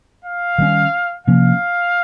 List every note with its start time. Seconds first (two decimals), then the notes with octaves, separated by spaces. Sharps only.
0.25 F5
0.58 D#3 G3 C#4
1.27 C3 F3 A#3 C#4 F5